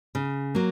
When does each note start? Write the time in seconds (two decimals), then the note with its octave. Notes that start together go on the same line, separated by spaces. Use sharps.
0.15 C#3
0.55 F#3 A#3